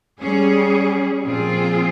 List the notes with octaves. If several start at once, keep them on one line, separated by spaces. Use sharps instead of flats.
G3 C#4 G#4
A#2 F3 C4 F4 G#4